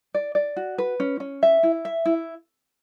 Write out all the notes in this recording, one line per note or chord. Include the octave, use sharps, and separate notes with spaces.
D5
D5
F#4
B4
C#4
C#4
E5
E4
E5
E4